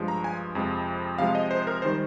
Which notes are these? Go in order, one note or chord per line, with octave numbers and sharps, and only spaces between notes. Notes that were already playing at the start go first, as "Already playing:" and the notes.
Already playing: G2 F3 G#3
A#5
G#5
F2 C3 F3 G#3
C3 F3 G#3 F5
D#5
C5
A#4
D#3 G3 C5